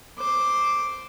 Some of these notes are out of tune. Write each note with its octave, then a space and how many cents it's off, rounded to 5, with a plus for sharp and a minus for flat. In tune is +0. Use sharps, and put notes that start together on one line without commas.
C5 -5 D6 +0